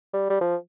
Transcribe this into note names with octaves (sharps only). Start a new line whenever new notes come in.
G3
G3
F3